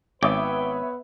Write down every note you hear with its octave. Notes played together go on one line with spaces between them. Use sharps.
G#1 B3 B4 C#5 E5 G5 D6 D#6